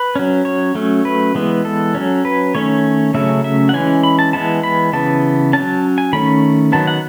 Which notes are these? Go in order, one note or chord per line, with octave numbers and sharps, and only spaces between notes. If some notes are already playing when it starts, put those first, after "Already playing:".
Already playing: B4
F#3 C#4
C#5
F#3 A3 C#4
B4
E3 G#3 B3
A4
F#3 C#4
B4
D#3 A3 C#4 C#5
C#3 F#3 A3 C#4 E5
E5
F#5
E3 G#3 C#4 G#5
B5
A5
E3 G#3 B3 A5
B5
C#3 E3 B3 A5
F#3 C#4 A5
G#5
D#3 A3 C#4 B5
D#3 F#3 B3 A5
F#5